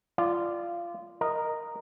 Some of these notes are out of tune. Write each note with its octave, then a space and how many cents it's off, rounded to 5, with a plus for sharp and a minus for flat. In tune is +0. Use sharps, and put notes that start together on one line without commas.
F4 -15 D5 +10
A#4 +0 D#5 -10